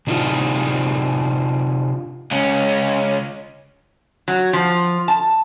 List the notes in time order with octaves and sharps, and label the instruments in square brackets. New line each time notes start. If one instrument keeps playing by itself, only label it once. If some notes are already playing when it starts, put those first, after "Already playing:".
[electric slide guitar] C3 D4 D#4 F4
[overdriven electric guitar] C#2 C#4
[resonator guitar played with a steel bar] F#3
F3
A5